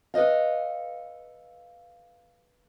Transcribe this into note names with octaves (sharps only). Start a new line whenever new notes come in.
A4 B4 C5 D#5 F5